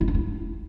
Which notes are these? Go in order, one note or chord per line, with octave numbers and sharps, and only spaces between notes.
E4
D4
E4